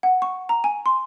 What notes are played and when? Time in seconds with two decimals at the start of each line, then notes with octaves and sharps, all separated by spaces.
0.03 F#5
0.22 C#6
0.49 A#5
0.64 G#5
0.86 C6